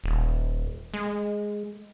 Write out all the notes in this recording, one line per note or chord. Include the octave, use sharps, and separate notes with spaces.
D#1
G#3